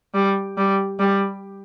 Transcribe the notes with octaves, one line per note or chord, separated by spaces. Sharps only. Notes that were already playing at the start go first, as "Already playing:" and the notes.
G3
G3
G3